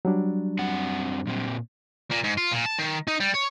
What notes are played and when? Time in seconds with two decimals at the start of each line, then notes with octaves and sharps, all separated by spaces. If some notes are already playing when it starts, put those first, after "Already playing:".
0.05 F#3 G3 D4
0.59 F#2 C4 F#5
1.27 A#2 C4
2.11 A#2
2.24 G#2
2.38 F4
2.52 A#2
2.66 A5
2.79 D#3
3.08 D#4
3.20 G3
3.34 C#5